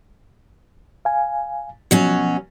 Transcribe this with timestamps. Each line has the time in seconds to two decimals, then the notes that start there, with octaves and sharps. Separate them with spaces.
1.05 F5 G#5
1.91 B2 F3 F#3 C#4